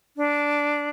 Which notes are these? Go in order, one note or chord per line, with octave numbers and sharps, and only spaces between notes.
D4